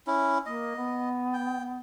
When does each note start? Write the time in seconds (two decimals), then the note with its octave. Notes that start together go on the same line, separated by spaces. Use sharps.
0.07 C#4 E4
0.46 A#3 D#5
0.76 B3
1.33 G5